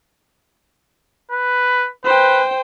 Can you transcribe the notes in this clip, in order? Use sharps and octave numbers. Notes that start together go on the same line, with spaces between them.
B4
B4 C5 G5